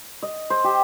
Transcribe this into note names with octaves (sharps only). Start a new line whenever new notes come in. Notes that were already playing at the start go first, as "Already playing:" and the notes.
D#5
C5
G4